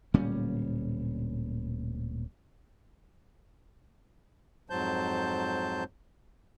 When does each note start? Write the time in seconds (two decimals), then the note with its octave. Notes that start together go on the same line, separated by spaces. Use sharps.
0.14 D1 A#2 G3 C#4
4.70 F2 G#2 F#3 C5 A5 G6